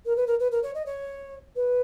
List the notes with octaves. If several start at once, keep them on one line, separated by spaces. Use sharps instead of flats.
A#4
B4
A#4
B4
A#4
C#5
D#5
C#5
B4